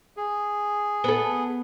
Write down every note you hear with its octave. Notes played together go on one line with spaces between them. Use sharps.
G#4
B3 A4